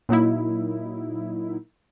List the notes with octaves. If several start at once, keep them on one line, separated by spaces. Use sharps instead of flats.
A#2 F#3 A#3 D#4 E4